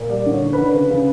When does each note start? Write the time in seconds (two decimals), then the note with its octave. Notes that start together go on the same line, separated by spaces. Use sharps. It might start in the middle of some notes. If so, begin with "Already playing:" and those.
Already playing: A#2
0.09 G3 D5
0.26 D3
0.32 C#5
0.42 D3
0.53 B4
0.58 D3
0.74 C#3 B4
0.90 C#3